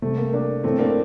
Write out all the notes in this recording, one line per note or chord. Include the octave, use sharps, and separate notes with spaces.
C3 G3 A3
A#3
A#3 D4
A2 F3 A3 C4
A#3 D4